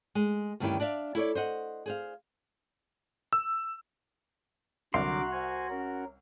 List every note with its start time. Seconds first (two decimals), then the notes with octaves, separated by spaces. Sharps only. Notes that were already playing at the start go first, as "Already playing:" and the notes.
0.15 G#3
0.60 D2 G2 D#3 C#4 E4 G4
0.80 D4 D5 E5 F5
1.15 E4 A4 C#5 D5
1.35 C5 D#5 F#5
1.86 G#4 C5 F5
3.33 E6
4.94 C2 D3 F#3 F#4 A#5 C6 D6
5.32 C5 G#5
5.70 C#4 A#4